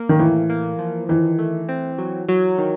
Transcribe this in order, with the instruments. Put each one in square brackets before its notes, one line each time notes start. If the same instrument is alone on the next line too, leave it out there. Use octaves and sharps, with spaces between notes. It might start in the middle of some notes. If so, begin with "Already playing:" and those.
Already playing: [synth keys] A#3
[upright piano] D#3
[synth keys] A2 [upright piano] E3
[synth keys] A#3
F3
[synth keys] D#3 [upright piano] E3
[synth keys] A3
C4
F#3
F#3
D#3